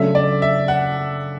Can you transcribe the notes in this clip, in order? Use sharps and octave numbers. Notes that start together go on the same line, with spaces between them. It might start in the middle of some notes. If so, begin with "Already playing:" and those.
Already playing: C#3 F#3 A3 D4 A4 E5
D5
E5
F#5